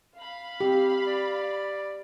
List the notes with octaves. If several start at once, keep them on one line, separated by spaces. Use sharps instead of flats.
F5 B5
C4 G4
D5